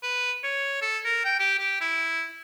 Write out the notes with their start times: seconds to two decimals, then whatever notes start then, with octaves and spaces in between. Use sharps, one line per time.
0.03 B4
0.44 C#5
0.82 A4
1.05 A#4
1.24 G5
1.40 G4
1.59 G4
1.81 E4